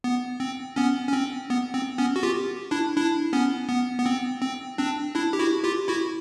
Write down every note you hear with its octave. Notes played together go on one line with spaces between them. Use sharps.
B3
C4
B3 C#4
C#4
C4
B3
C4
B3 C#4
F#4
F4 G4
D4 E4
D4 E4
B3 C#4
B3
B3
C4
C4
C4 D4
D4 E4
G4
E4 F#4
F4 G4
E4 F#4